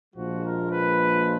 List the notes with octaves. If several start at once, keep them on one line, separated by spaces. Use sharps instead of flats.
A#1 A#2 F3 G#3 F#4
A#4
B4